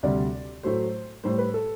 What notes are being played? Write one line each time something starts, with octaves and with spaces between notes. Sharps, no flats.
D2 C3 G3 D5
A2 F#3 A3 C5
A2 G3 C5
B4
A4